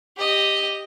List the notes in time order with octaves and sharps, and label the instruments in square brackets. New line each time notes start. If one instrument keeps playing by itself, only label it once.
[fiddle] G4 D#5